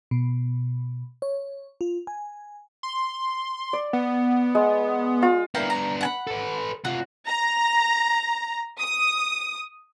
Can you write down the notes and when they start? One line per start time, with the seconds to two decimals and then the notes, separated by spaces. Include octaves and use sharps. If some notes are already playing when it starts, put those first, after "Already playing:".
0.11 B2
1.22 C#5
1.81 F4
2.07 G#5
2.83 C6
3.73 D5
3.93 B3
4.55 G#3
5.22 F4
5.55 A#3 B3 D4 E4 G5
5.70 A#5
6.01 F#5 G#5 B5
6.27 A4 B4
6.85 C3 F4 F#4
7.28 A#5
8.80 D#6